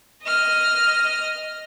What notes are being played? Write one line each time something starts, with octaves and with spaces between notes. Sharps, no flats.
D#5 F6